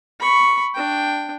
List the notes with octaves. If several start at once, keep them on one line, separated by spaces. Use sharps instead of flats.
B5 C#6
D4 G5